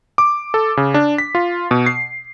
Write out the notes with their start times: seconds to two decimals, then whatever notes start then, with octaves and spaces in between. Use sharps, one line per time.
0.18 D6
0.54 A4
0.77 C#3
0.94 D4
1.18 B6
1.35 F4
1.71 B2
1.86 C7